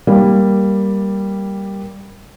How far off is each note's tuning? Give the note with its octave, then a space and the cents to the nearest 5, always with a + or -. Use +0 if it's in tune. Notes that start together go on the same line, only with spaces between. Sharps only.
G3 +0 A#3 +5